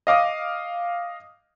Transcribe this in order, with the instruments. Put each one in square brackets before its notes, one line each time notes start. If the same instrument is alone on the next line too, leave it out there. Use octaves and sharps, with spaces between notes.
[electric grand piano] D#5 F5 D6 D#6